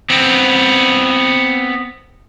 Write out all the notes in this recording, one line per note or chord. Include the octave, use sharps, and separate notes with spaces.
B3 C4